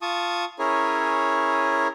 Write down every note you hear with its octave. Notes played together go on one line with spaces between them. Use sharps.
F4 A5 C#6 D#6
C#4 E4 G#4 A#4 C#5